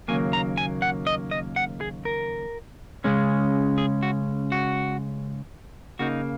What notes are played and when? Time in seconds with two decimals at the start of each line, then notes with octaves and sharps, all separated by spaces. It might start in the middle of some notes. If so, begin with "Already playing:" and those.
0.08 D#2 C#3 F#3 A#3 G#5
0.33 A#5
0.58 G#5
0.82 F#5
1.07 D#5
1.31 D#5
1.56 F#5
1.81 G#4
2.05 A#4
3.04 C#3 G#3 C#4
3.78 G#4
4.03 F#4
4.52 F#4
5.99 C#3 A#3 D#4 F#4